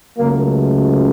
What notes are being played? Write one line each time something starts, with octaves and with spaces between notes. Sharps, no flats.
C#2 C#3 F#3 A3 A#3